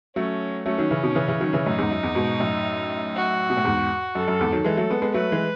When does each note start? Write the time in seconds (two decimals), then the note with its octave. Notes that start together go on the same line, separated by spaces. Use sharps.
0.16 F#3 A3 C#4
0.66 F#3 A3 C#4
0.78 D#3 F#3
0.91 C#3 E3
1.03 B2 D#3
1.15 C#3 E3
1.28 C#3 E3
1.41 D#3 F#3
1.53 C#3 E3
1.65 F#2 A2 D#4
1.78 E2 G#2
1.91 F#2
2.03 E2
2.15 G#2 B2
2.40 F#2 A2
3.16 F#4
3.50 B2
3.57 A2
3.65 E2 G#2
4.15 F#2 A4
4.28 F#2
4.40 E2 G#2
4.53 D#3 F#3
4.64 E3 G#3 A4
4.77 F#3 A3
4.90 G#3 B3
5.02 G#3 B3
5.14 F#3 A3 B4
5.32 E3 G#3